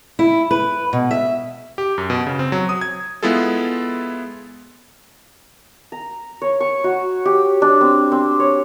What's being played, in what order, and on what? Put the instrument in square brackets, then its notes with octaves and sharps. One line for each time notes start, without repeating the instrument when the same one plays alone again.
[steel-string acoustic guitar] E4
B4
B2
E5
[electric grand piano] G4
F#2
B2
C#3
C4
F#3
D#6
G#6
G#3 B3 E4 F4 G#4 A4
[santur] A#5
C#5
C#6
F#4
G4
D4
C4
C4
C#5